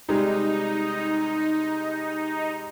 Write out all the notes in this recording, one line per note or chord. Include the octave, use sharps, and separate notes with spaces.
C3 G3 G#3 D#4